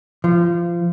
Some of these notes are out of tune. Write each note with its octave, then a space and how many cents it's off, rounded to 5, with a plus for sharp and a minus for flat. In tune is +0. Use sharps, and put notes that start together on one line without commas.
F3 -25